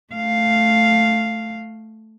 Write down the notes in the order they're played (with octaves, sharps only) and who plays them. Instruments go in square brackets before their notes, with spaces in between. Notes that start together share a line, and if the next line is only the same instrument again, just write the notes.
[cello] A3 F5